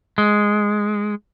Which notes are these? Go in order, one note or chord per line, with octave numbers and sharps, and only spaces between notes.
G#3